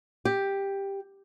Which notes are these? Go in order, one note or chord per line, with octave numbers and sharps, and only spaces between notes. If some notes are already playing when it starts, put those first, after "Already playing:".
G4